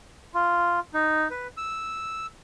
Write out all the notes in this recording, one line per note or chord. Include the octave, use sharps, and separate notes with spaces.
F4
D#4
B4
E6